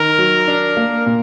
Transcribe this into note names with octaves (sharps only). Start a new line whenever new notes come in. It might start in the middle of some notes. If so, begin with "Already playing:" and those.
Already playing: D#3 A#4
F#3
D4
A#3
A#2